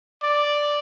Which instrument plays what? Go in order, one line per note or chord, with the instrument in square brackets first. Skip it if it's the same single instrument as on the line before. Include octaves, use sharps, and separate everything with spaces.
[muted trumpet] D5